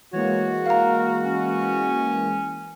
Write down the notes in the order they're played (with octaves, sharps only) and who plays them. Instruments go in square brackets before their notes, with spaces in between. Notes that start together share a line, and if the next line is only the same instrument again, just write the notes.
[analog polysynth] E3 G#3 A#3 [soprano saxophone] F#4 [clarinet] C#5
[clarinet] A#4 [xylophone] F5 A#5
[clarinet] C#4